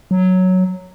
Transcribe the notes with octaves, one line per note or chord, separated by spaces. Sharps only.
F#3